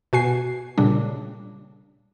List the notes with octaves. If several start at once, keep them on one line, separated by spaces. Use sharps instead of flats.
B2 F#4 G#5 C7
A#2 C#3 G3 D4